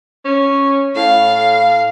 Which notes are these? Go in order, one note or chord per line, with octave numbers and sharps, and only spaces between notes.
C#4
A2 F5